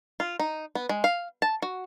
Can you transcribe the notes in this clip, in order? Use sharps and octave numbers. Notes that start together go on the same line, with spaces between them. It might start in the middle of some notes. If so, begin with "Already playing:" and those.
F4
D#4
B3
G#3
F5
A5
F#4